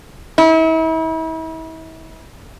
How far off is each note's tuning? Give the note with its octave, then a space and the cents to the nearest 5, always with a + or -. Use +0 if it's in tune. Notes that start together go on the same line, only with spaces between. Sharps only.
E4 -40